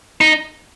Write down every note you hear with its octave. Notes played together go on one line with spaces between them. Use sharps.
D#4